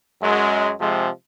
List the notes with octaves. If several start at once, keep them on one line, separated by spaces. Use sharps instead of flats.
F#2 G#3
C3 F3 G#3